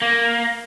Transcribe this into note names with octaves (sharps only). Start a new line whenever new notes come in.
A#3